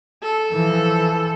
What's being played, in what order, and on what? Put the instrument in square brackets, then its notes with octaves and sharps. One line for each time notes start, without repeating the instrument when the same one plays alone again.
[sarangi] A4
[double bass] E3 F3